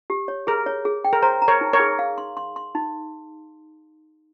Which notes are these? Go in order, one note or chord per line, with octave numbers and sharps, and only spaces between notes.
G4
C#5
G#4 A#4
C#5
G#4
G5
A#4
C5 A#5
A#5
A#4 C#5
D#4
A#4 C#5
G#4
F5
C6
C6
C6
D#4